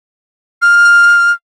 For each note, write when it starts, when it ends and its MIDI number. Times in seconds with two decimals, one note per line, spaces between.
0.62 1.32 89